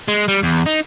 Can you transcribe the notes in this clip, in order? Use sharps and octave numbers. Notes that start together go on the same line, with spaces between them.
G#3
G3
E2
D#4